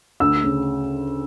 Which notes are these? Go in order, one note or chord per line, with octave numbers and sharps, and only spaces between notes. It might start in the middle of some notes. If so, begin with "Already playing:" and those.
D2 E6
C#3